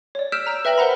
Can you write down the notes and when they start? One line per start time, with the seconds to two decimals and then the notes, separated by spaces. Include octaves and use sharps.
0.15 C#5 D5
0.32 E6 F6 G6 B6 D7 E7
0.47 A#5 E6
0.65 B4 E5 G5 A#6 F#7
0.78 A#4 C5 F#5 A#5 B5